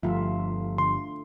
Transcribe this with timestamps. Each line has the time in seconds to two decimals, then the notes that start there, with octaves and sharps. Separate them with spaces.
0.03 G1 F3 A3 F4 E5
0.78 D3 C6